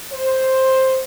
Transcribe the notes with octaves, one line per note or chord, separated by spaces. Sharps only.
C5